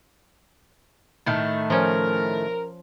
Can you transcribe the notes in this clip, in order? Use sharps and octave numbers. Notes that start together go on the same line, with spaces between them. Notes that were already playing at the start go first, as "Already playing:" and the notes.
A2 D#3 A3
F3 C#4 A#4